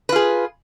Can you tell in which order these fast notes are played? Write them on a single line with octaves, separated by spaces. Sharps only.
B4 F4 G#4